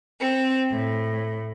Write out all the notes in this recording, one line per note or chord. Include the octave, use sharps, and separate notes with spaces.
C4
A2